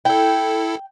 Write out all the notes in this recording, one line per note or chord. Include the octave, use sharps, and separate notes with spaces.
E4 A4 G5